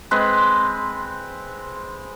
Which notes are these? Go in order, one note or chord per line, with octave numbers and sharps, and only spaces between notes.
G#3 C4 B4